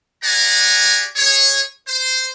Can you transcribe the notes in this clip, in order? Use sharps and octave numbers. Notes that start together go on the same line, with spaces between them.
G4 G#4 D5 F#5 G#5 A#5
G#4 C#5
C5